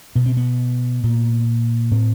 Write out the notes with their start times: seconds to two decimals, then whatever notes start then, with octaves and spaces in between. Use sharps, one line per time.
0.15 B2 B3
0.26 C4
0.37 B3
1.04 A#2
1.91 A2 C4